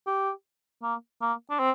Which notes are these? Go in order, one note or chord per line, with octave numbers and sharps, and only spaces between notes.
G4
A#3
A#3
D4
C4